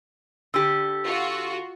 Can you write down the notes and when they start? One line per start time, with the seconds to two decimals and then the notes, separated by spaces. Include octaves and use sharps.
0.54 D3 G4 E6
1.04 F4 F#4